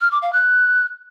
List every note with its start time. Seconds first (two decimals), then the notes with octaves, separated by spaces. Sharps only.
0.01 F6
0.11 D6
0.22 F5
0.33 F#6